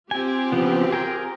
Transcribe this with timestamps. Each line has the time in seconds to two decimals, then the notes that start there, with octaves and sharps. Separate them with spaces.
0.11 C4 F4 G4 G#5
0.52 C#3 F3 B3
0.92 G#4 A#4 G5